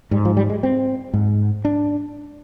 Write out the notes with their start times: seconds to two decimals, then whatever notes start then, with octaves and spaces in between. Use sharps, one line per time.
0.11 G#2 G3
0.25 F3
0.37 G3
0.50 G#3
0.63 C4
1.14 G#2
1.65 D4